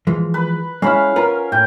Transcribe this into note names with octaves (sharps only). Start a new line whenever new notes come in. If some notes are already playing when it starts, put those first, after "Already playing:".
E3 F3 G#3
B4
G#3 C#4 E4 F5 B5
F4 A#4 B4 F#5
A2 G5